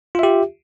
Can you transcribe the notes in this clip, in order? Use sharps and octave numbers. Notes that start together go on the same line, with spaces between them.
F4 G4 E5